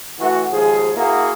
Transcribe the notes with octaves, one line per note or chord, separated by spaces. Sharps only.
E3 A3 F#4
D#2 G#2 F3 G#4
A#3 E4 F#4 G#4 A#4